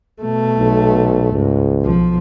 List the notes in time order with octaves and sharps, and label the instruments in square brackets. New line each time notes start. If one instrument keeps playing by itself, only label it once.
[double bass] B2 A3
[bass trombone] B1
[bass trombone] C#2 [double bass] G#2
[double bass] B1 F3